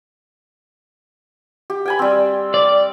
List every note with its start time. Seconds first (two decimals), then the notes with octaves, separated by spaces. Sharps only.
1.70 G4
1.86 G5 G#5 B5
1.99 G3 C4
2.54 D5